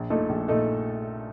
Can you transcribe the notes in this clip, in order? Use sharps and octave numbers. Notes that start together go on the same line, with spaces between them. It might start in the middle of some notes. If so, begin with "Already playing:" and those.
Already playing: A#1
A#2 A3 D#4 A4
A#1
A#2 A3 D#4 A4